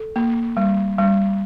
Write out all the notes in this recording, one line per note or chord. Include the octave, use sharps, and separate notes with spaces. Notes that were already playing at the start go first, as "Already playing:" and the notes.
Already playing: A4
A#3
G3
G3